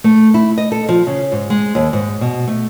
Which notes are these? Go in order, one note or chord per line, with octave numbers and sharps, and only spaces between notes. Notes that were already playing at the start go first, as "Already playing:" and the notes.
A3
E4
D#5
A4
F3
C#3
G#2
G#3
D#2
G#2
B2
A3